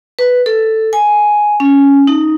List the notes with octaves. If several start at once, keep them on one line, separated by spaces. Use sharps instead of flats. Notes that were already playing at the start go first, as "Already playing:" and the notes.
B4
A4
G#5
C#4
D#4